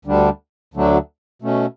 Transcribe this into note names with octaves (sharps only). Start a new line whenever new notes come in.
D2 D3 G3 D4
D2 D3 F#3 A3 D4
B2 A3 C#4